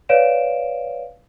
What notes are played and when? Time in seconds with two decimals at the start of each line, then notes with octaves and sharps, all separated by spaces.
0.09 B4 C#5 D5 F5 D7 E7